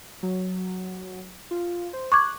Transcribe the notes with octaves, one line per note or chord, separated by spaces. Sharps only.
F#3
F4
C5
C#6 D6 F#6 G#6